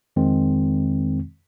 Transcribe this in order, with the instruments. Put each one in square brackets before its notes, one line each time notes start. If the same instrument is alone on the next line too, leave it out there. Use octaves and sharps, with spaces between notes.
[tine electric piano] F2 D#3 G#3 C4